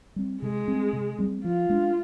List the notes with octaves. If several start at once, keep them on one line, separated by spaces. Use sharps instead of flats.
G3 C4
C3 G#3
G3 C4
C3
G3 C4
F3 F4
G#3 D4